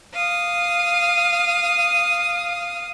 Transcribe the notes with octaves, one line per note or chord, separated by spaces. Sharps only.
F5 D#6